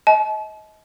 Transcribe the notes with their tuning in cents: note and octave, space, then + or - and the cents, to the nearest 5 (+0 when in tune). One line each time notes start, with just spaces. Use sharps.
D#5 +30 A5 -40